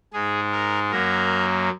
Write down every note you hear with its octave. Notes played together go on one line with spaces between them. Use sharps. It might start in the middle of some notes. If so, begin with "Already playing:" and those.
G#2 G#3 G#4
A#4
F#2 F#3 A#3 A#4